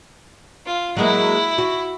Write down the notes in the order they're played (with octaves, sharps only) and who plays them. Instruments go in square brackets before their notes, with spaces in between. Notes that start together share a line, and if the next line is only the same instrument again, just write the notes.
[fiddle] F4
[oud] F#3 G#3 A#3 [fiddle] E4
[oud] F#4